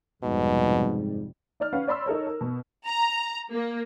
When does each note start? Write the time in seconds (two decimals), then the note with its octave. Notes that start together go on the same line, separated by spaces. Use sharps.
0.24 F1 F2 G#2 B2 G3
1.60 D#4 D5 F6
1.73 C#4 B4 F5 F#5
1.87 C#5 D5 B5 C6 E6
2.06 D#4 A4 A#4 C#5
2.27 A#4
2.41 B2
2.85 A#5
3.50 A#3